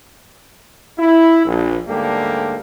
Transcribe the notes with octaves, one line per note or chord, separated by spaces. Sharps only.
E4
A#1
D2 G#2 G3 A#3 G4 A4